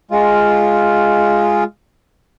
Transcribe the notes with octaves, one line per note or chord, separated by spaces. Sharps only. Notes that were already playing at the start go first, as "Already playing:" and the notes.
G#3 F4